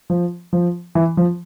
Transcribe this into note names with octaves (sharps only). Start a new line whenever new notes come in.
F3
F3
E3
F3